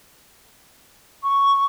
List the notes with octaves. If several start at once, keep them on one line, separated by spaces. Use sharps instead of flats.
C#6